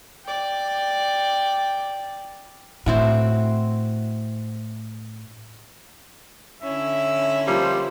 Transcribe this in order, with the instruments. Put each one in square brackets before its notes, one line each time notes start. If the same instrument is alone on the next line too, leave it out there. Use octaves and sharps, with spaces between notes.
[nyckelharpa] D5 G5
[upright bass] A2 [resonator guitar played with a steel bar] C4 E4 F#4
[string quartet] D3 C#4 E4 [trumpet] E5
[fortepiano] F3 A#3 [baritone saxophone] G3 [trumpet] C5